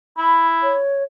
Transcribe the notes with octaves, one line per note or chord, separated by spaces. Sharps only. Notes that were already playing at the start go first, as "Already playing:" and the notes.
E4 B5
C#5